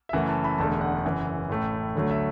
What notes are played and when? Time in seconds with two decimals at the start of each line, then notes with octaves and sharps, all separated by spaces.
0.09 E5
0.13 F#1 F#2 E3 A3 F#5
0.28 A5
0.44 B5
0.58 E1 E2 D3 A3 A5
0.81 F#5
1.05 F#1 F#2 E3
1.49 A1 A2 A3
1.96 D2 D3 F#3 A3
2.11 E5